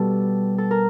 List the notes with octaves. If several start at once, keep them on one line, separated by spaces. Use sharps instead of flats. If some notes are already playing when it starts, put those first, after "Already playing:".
Already playing: B2 G3 A4
A4
A#4